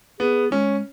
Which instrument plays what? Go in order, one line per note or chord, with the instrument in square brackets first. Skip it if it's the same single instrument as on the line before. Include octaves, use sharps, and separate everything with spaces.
[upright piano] B3 [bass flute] G#4
[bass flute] G#3 [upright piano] C#4